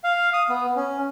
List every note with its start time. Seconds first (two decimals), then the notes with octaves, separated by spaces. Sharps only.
0.04 F5
0.33 D#6
0.49 B3
0.76 C#4